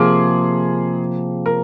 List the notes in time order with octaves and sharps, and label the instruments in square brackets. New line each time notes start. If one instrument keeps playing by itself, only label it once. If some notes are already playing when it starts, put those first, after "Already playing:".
Already playing: [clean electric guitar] C3 F3 A#3 [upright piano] G#4
[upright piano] A#4